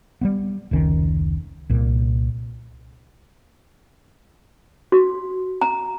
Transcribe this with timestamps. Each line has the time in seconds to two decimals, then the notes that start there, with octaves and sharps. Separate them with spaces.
0.21 G3 A#3 B3
0.71 F1 C#2 D#3 C#4
1.70 C2 A#2
4.92 F#4
5.61 A#5